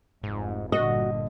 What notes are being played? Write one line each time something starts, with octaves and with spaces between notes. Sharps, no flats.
F1 G#2
G1 A#2 D3 F#4 D#5